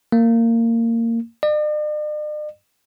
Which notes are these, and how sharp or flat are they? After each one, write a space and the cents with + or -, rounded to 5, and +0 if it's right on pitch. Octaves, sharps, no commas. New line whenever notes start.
A#3 -20
D5 +45